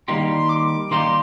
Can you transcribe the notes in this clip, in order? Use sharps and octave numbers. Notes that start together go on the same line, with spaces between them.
D#3 G3 A#3 D#4 G4 C6
D6
D#3 G3 A#3 D#4 G4 C6